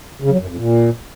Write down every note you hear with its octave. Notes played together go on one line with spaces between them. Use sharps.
C#3
F#3
F#2
F2
A#2